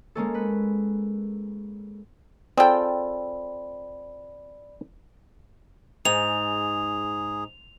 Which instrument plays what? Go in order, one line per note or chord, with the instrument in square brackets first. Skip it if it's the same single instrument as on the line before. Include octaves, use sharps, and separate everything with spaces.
[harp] G#3 A#3 C#4 A4
B4
[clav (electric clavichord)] C4 F4 A4 [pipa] G#4 G5 [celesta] D5 B5
[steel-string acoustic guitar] G#2 [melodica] G#4 [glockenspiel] F7